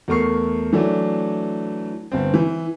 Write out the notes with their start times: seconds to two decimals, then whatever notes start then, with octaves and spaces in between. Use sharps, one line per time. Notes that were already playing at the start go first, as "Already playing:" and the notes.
0.08 E2 A3 A#4 C#6 C7
0.73 E3 F#3 A3 D4
2.12 G1 C4
2.34 E3